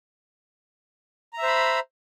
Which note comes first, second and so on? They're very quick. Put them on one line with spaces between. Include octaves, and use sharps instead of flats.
A#5 E5 C5 B5